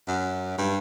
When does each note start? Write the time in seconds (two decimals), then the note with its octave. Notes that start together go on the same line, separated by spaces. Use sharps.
0.08 F#2
0.58 G2